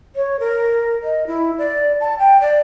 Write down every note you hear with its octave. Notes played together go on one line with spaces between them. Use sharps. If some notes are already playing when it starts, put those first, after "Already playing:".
C#5
A#4
D#5
E4
D5
A5
G5
D5